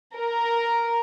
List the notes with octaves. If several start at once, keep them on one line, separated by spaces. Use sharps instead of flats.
A#4